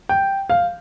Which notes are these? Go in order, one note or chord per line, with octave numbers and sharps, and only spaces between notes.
G5
F5